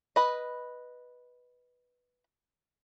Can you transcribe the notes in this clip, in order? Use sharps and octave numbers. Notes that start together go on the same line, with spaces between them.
B4 D#5